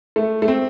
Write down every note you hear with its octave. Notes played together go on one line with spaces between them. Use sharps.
A3
A3
C4